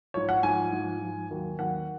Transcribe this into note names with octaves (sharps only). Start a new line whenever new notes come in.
G#2 F3 C#5
F#5
G#2 F3 G#5
G#2 F3
G#2 F3
D#2 D#3 F#3
D#2 D#3 F#3 F#5